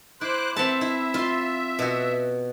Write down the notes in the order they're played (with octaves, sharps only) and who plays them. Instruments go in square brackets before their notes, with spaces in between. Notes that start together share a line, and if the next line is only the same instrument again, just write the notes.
[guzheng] E4 [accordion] C5 D6 F#6
[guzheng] C4 F#5 A5 [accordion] E5
[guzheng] E4
F4 C6
B2 F#4